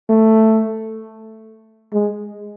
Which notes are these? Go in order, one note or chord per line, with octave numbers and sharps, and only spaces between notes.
A3
G#3